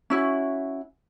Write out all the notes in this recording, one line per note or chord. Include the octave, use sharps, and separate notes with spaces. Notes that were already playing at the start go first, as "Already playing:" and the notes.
C#4 E4 F#4